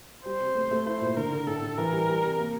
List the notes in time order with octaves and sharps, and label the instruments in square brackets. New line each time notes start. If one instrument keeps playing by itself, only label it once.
[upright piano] G3 [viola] C5
[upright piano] C3
A3
A3
[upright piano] E4 [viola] C5
[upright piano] A#2
[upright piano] D3 [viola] A#4
[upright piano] D3
[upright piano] A2 [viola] A4
[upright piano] A2
[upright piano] E3 [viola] A#4
[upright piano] G3
G3
C3
A#3